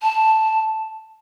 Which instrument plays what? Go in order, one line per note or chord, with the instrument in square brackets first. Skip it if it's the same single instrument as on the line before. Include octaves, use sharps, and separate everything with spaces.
[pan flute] A5